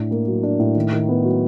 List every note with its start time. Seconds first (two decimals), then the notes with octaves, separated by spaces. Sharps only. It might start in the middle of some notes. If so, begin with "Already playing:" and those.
Already playing: A2 D4
0.11 A#3
0.27 F#3
0.43 D4
0.59 A2
0.75 D#3
0.93 D#3
1.09 B3
1.24 F#3